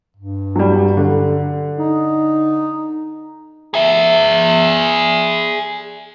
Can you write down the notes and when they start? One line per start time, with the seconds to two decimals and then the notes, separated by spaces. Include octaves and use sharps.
0.17 G2
0.56 F#3 G3
0.97 D3
1.78 D#4
3.74 G#4 E5